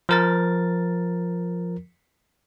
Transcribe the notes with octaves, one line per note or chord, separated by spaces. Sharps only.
F3 A#4 A6